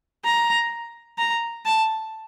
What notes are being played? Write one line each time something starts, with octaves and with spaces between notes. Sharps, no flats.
A#5
A#5
A5